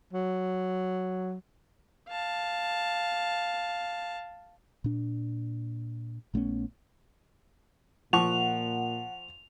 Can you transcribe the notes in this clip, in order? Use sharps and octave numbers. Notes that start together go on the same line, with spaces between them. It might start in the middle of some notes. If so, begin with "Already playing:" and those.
F#3
F5 A5
A#2 D4
A#1 A3 B3 C#4
A#2 F3 F#5 C#6 F7